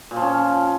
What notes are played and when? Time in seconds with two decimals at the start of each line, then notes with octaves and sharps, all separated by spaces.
0.11 A#2
0.16 F3
0.22 C#4